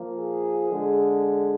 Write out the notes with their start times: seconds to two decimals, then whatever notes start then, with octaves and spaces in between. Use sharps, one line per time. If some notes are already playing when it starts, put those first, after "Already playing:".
Already playing: A#2 F3 A#3
0.15 G#4
0.72 D3 G#3